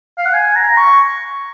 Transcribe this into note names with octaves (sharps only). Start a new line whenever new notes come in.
F5
F#5
G#5
A#5
C#6